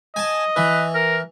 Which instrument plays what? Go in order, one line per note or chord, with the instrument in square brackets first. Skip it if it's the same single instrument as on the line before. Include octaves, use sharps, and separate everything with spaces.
[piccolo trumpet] D#5 [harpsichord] G#5 A5
[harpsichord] E3 [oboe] B4
[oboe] A#4